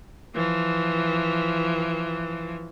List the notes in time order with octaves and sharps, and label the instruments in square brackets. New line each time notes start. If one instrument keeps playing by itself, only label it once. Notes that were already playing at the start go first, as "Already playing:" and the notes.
[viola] E3 F3